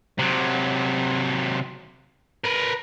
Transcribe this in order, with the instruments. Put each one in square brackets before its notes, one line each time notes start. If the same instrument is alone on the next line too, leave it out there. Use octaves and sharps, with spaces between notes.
[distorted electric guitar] C3 F#3
A#4 B4